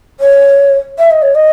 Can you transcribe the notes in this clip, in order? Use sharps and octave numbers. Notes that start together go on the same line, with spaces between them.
C#5
E5
D#5
C#5
D#5